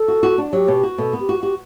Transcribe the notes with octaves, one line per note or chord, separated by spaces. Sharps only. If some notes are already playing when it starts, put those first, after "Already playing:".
Already playing: A4
F#4
F#4
D4
F#3 G4
B2
F#4
B2 A4
B3
G4
F#4
F#4 G4